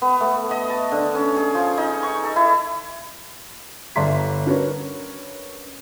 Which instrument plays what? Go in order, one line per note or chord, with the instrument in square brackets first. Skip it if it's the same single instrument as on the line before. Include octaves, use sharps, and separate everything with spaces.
[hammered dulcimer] B3
A3
D#5
A5
D3
C#4
G#4
F3
D#4
C#6
A4
E4
[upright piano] G1 D5 E5 A#5 C6 B6
C#4 D4 F#4 A#4 B4 C#5